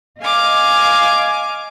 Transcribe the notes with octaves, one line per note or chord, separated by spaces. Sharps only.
D#5 F5 G#5 D6 F6